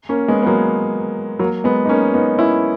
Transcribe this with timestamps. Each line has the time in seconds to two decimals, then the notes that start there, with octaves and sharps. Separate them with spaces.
0.09 A#3 C#4
0.28 G#3 B3
0.42 B3
0.47 F#3 A#3
1.39 F#3 A#3
1.64 G#3 B3
1.85 D#4
1.89 A#3 C#4
2.14 B3 D#4
2.39 C#4 E4